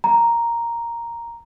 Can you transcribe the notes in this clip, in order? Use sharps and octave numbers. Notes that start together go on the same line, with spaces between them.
A#5